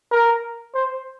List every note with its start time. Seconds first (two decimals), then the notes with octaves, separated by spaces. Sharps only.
0.11 A#4
0.74 C5